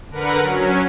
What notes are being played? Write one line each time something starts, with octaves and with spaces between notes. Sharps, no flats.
D3 A#4 B4 F#5
F#3 C#4